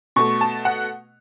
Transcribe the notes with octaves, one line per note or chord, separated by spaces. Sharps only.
B2 A3 C#6
A5
F#5